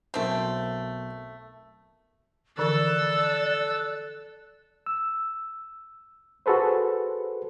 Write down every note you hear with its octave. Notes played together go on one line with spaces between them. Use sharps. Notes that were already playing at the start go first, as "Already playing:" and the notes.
B1 A3 C4 A#4 G6
D3 E3 F3 A4 D5 E6 F#6
E6
F#4 G#4 A4 B4 C5